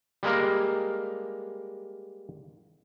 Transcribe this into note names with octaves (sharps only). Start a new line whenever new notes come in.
G3 G#3 A#3 A#4